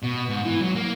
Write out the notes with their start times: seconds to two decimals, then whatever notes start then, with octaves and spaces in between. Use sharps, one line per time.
0.03 B2
0.29 G#2
0.45 E3
0.62 F#3
0.76 A#3